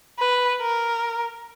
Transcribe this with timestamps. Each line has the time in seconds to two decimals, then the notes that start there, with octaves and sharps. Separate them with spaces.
0.19 B4
0.62 A#4